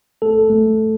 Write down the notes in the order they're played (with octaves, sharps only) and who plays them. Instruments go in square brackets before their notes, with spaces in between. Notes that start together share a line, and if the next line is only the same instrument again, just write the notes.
[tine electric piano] A3 A4
A3